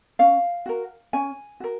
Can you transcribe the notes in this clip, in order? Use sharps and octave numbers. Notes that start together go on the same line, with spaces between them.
C#4 F5
F#4 A#4
C#4 G#5
F#4 A#4